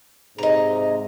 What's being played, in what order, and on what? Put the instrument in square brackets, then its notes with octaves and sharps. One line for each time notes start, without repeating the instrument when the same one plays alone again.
[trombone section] G#2 C3 G#3 [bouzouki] D#5 A#5